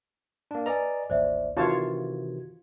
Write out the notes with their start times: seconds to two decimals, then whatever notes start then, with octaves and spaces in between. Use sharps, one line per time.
0.51 A#3 D4
0.66 B4 D5 D#5 G#5 A#5
1.10 A1 D#2 C5 D5 E5
1.57 C3 D#3 E3 F4 F#4 C#5 A5 G#6